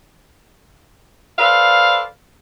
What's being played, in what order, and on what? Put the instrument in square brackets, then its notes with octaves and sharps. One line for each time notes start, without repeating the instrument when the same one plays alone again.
[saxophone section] A4 B4 C5 D5 F5